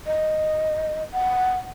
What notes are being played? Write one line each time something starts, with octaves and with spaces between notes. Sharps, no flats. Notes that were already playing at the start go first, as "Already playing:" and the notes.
D#5
F#5